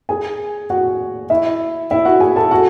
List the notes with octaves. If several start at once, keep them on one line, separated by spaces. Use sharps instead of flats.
G#4 G#5
F#4 F#5
E4 E5
E4 E5
F#4 F#5
G#4 G#5
A4 A5
F#4 F#5